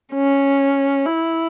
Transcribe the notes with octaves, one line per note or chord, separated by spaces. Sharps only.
C#4
E4